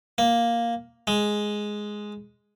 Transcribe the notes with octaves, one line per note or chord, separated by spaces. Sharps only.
A#3
G#3